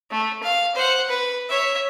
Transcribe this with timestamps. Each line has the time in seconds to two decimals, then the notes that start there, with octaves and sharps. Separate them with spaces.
0.11 A3
0.43 F5
0.75 C5 F#5
1.09 B4
1.49 C#5 E5